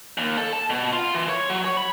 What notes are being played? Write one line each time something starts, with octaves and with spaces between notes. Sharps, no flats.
D#2
A4
A5
B2
F4
E3
C#5
F#3
C#5
B5